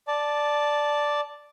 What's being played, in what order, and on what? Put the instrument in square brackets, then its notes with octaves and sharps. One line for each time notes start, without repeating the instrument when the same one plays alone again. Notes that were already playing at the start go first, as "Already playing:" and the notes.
[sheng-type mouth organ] D5 A5